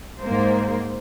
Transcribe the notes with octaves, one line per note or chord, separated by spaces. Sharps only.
G#2 A#3 C5